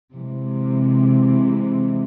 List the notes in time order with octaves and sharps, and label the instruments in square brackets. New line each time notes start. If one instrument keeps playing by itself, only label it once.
[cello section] C3 E3 G#3